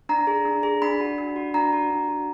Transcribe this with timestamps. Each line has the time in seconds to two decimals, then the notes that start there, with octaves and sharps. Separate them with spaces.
0.09 D4 A#5
0.27 G#4
0.45 D4
0.63 G#4
0.82 D4 B5
1.00 F#4
1.18 D4
1.36 F#4
1.54 D4 A#5
1.73 F#4
1.90 D4
2.09 F#4